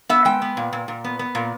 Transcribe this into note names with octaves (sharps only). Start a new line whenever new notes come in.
B3 E5
G#3 G5
B3
A#2
A#2
A#2
B3
B3
A#2